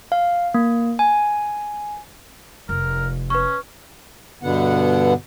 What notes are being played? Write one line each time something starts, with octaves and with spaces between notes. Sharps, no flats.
F5
A#3
G#5
F1 A#4
C#4 B4 C#6
G2 B2 D3 B3 F#5